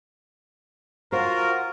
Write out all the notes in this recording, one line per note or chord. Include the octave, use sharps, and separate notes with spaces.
F4 F#4 A#4 C5